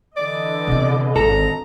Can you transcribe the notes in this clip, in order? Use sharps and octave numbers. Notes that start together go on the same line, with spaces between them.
D3 E3 D5 D#5
C3 B3
G#1 A4 A#5